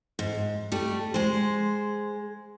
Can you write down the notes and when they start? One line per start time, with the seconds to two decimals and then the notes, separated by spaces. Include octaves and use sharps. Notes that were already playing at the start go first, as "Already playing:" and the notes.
0.19 G#2
0.72 G3 A3
1.14 G#3 C5